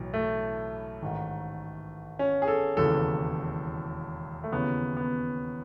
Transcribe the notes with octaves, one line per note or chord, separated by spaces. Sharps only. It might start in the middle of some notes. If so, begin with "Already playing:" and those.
Already playing: B1 A2 E3
A3
A1 G#2 D#3
C#4
G#4
A4
E1 D#2 C#3 E3 A4
A3
D#2 C#3 E3 B3
B3